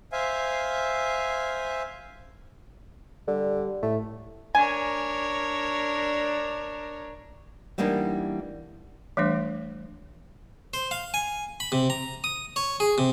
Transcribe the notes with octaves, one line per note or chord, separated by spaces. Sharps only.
C5 E5 F5 G#5
D3 G3
A2 A3
D4 A#4 C#5 G#5
E3 G3 A#3 B3 D4 D#4
E3 G3 A3 D4 C5
C5
F5
G#5
B5
C3
A#5
D#6
C#5
G#4
C3